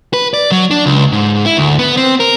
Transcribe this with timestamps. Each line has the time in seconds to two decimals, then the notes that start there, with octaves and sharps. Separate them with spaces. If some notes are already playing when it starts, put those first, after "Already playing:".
0.13 B4
0.34 D5
0.52 F#3
0.71 D4
0.86 C#2
1.12 G#2
1.46 E4
1.57 D2
1.79 B3
1.97 C4
2.20 A#4